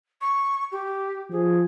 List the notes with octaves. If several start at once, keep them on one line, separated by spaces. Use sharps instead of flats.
C#6
G4
F3 G#4